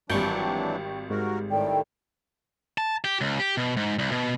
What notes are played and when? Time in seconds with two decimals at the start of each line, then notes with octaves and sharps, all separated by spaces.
0.10 G#1 E3 F#3 G3 D4 G5 C#6
1.10 G#2 F#4 A#4
1.51 A2 D#3 A4 D5 G5
2.78 A5
3.04 G4
3.21 C#2
3.40 G4
3.57 B2
3.77 G#2
3.99 C2
4.12 B2